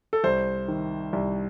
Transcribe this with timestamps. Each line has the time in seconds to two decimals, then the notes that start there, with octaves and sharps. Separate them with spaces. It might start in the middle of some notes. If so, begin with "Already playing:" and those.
0.13 A4
0.24 C2 C5
0.68 D#3
1.13 C2